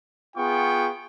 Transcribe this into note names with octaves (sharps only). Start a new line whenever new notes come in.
B3 F4 G#4 F#5 G5 C#6